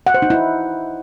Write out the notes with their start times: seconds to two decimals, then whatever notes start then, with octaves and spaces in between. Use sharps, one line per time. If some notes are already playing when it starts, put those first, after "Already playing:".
0.07 F#5
0.14 C5
0.22 D#4
0.30 E4